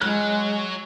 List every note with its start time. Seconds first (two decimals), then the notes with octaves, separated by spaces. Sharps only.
0.01 F#3 G#3 F#6